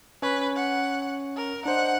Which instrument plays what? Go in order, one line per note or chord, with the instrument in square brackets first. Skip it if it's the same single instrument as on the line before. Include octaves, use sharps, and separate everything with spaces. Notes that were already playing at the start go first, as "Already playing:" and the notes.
[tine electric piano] C#4 C#5 [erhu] B4
[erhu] F#5
A#4
[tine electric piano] D4 C5 D#5 [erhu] F#5